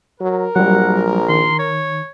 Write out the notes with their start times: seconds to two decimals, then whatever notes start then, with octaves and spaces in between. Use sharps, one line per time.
0.21 F#3 A#4
0.56 A#1 F#3 G3 F#5
1.29 D#3 C6
1.59 C#5